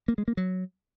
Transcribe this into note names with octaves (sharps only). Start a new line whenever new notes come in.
A#3
G#3
A#3
F#3